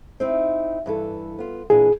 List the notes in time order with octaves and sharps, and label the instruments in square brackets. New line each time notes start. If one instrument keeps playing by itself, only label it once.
[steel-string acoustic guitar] C4 D#4 E4
G2 E3 A4
B3 F4
[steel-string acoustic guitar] A#2 E3 D4 [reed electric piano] G#4